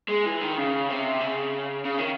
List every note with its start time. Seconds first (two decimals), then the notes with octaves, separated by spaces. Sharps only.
0.08 G#3
0.25 E3
0.41 D#3
0.57 C#3
0.89 C3
1.21 C#3
1.85 C#3
1.98 D#3